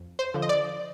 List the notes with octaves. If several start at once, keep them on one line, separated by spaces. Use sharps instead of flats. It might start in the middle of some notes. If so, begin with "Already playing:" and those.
Already playing: F2
C5
D3 F3
D#5
D5